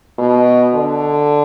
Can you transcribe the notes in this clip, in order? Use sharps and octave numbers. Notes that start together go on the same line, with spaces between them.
B2
D3